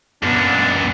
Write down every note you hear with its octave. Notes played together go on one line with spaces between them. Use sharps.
F#2 A#2 B3 D4